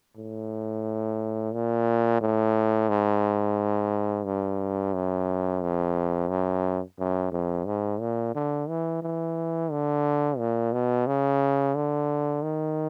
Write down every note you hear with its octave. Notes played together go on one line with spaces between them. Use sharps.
A2
A#2
A2
G#2
G2
F#2
F2
F#2
F#2
F2
G#2
A#2
D3
E3
E3
D3
A#2
B2
C#3
D3
D#3